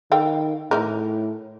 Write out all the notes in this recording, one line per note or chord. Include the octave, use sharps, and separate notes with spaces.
D#3 A4 F5 G5
A2 E3 D#4 A#4